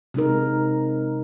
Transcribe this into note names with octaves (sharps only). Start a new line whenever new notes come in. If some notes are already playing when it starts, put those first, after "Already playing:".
C3 G#3 D#4 A#4